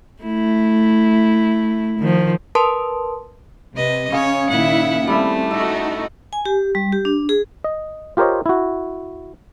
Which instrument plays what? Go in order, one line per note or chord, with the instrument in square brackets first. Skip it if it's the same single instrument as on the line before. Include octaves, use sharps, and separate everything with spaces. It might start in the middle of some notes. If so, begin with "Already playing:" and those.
[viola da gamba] A3 E4
D#3 F3
[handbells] A#4 B4 A5 C6 D#6
[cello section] C3 [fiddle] B4 D#5
[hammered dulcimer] C#3 G#4 [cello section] C#4 [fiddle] C#5
[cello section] A#2 D#3 E4 [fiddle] E5 F#5
[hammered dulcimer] G3 E4 [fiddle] A3 [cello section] C4
[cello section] D#4 F#4 [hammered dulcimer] A4
[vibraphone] G#5
G4
G3
G4
D4
G#4
[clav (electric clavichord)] D#5
F4 G4 A#4 C5 C#5 D#5
E4 F#4